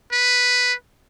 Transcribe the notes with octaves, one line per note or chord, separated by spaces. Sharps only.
B4